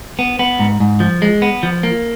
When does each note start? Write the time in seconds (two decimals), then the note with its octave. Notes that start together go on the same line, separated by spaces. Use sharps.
0.19 B3
0.39 B3
0.59 G#2
0.80 G#2
1.00 F3
1.22 G#3
1.42 B3
1.63 F3
1.83 A#3